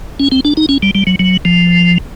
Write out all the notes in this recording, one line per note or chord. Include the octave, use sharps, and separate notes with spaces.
C#4
C4
D4
D#4
C#4
G3
G3
F#3
F#3
F3